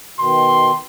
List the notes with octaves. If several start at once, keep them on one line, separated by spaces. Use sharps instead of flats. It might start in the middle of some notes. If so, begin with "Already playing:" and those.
B2 D#3 C6